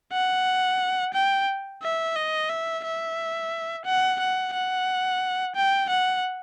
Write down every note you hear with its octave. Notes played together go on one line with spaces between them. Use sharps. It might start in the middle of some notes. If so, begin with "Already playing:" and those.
F#5
G5
E5
D#5
E5
E5
F#5
F#5
F#5
G5
F#5